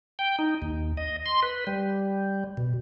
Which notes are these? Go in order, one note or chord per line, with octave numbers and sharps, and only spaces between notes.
G5
D#4
D#2
D#5
C6
B4
G3
B2